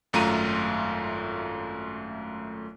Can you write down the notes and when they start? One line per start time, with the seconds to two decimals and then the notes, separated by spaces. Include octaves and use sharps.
0.13 G#1 F#2 A3 F4 A#5 D#7